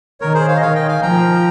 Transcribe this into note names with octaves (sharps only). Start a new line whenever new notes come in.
D#3 A#4 C#5
G#4 C5
C#5 F5
D#5
D#3 C#5 F5
D#5 G5
F5 G#5
F3 G5 A#5